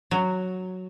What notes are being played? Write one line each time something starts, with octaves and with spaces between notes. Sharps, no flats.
F#3